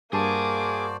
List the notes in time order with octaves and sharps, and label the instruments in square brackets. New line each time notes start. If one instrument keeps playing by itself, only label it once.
[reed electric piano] G2 A5 [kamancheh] A#3 D6 [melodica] F#4 C5 D5 [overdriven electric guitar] G#4